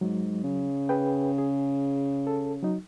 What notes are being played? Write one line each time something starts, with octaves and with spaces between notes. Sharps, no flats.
G#2 F#3
C#3
G#4 B4 G5
G#4
A4
F#3 D#4